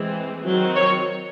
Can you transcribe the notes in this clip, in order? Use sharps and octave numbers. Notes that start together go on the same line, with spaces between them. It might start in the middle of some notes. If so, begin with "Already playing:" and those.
Already playing: E3 G#3 C4
D#3 F#3 C4
C#5